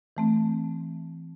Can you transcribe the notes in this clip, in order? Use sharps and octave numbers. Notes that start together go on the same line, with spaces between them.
E3 A3 C4